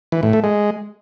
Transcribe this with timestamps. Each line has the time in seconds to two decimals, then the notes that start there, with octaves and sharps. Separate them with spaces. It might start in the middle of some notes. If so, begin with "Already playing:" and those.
0.12 E3
0.23 A2
0.33 A3
0.44 G#3